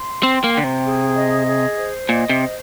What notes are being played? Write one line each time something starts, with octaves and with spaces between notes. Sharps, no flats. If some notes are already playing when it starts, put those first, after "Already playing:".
Already playing: C6
C4 G5
A#3
D3 G5
C3
G#4
D#5
G#4
C5
A#2 D#5
C3
C5